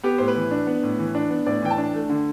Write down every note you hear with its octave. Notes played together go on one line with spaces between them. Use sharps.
B3 G4
A2 C5
B4
E3
D4
B3
A2
E3
D4
B3
A2 D5
E3 G5
A5
D4
A3
D3